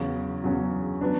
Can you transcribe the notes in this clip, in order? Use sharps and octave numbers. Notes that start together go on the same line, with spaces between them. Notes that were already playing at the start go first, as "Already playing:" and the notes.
Already playing: E2 C#3 F#3 C#4
E2 C#3 F#3 C#4
F#3 B3 D4